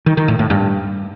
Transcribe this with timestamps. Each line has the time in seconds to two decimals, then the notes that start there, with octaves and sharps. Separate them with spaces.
0.06 D#3
0.17 D#3
0.28 A2
0.39 A2
0.50 G2